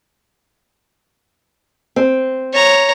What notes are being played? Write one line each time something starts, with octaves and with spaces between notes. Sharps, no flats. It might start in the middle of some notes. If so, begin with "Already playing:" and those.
C4
C#5 A#5